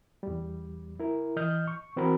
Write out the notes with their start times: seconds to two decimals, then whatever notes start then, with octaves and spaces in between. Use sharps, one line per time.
0.23 E2 G3
1.00 E4 A#4
1.36 E3 D#5 F6 G6
1.68 C#6
1.96 E3 C4 F#4 A#4 B5